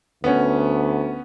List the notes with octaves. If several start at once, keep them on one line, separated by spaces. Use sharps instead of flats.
D2 B3 C#4